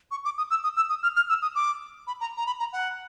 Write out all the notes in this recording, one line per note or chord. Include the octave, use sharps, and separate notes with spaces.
C#6
D6
D#6
E6
D#6
E6
D#6
F6
F6
E6
D#6
D6
B5
A#5
A#5
B5
A#5
F#5